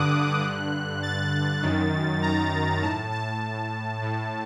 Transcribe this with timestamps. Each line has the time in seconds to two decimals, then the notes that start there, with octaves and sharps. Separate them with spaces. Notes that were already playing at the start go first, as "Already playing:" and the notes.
Already playing: G2 D3 D6 D#6 F#6
0.42 G2 D3
1.03 A6
1.62 F#2 D#3
2.22 A#5
2.82 A2 A5
3.12 A5
4.02 A2